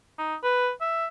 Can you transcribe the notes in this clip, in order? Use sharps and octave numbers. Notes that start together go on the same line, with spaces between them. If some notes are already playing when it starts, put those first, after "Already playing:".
D#4
B4
E5